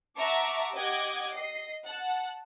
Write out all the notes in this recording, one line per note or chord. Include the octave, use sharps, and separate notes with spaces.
E5 F#5 A5 A#5 C#6 D6
G4 D#5 F#5 D6 G#6
D#5 C7
F#5 A5